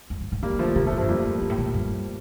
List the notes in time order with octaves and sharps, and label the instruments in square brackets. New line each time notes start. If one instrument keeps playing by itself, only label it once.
[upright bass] F2
G2
A2
[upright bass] D#3 [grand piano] G3 A#3
[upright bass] D#3
[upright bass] D3 [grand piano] F3 A3
[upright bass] C3 [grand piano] G3 A#3
[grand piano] F3 A3
[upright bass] A2
[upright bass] G2 [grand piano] F3 A3
[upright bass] F2 [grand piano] G3 A#3
[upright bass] F2
G2
A2
A#2
A2
G2